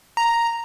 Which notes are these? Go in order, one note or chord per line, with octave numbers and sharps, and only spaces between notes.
A#5